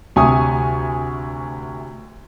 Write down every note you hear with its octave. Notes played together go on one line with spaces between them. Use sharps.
D2 C3 G#5 C#6 D#6